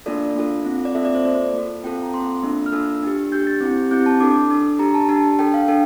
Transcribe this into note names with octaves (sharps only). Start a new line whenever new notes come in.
A#3 D4 F4 A4 D5
A#3 D4 F4 A4
C4 F4 A4
D5
C4 F4 A4 E5
D5
C5
A#3 F4 A4 D5
A#3 F4 A4
C4 F4 A4 G5
A#5
C4 F4 A4 C6
A#3 D4 F4 A4
F6
A#3 D4 F4 A4 E6
D4 G4
D4 G4 G6
A6
C4 E4 G4
C4 E4 G4 G6
A5
D4 A4 D6
D4 A4
D4 G4 A#5
A5
D4 G4 A5
D4 A4 G5
F5
D4 A4 G5